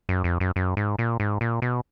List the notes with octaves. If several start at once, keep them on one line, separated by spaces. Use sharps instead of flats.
F#2
F2
F#2
F#2
G#2
A#2
G#2
A#2
B2